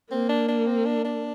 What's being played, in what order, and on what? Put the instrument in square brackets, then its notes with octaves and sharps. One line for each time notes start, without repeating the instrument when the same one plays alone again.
[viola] A#3 [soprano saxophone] C4
[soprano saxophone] D4
D4
C4
D4
D4